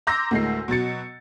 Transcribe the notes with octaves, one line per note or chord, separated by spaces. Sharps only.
A#5 C6 D6 E6 G6 A#6
D2 A2 G#3 A#4 C7
B2 F#3 A6 C#7